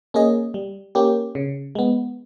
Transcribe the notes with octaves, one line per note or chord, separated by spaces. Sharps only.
A#3 C#4 G#4 D#5
G3
A#3 C#4 G4
C#3
G#3 B3